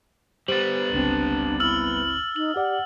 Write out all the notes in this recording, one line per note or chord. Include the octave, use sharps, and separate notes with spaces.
G3 B3 G4 C5 A6 F#7
G1 C#2 C4 D4
E4 E6 F6 F#7
D#4 F#7
G4 D5 F#5